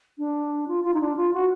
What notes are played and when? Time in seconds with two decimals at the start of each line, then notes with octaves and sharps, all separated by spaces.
0.18 D4
0.68 F4
0.84 F4
0.94 D#4
1.00 D4
1.16 F4
1.33 F#4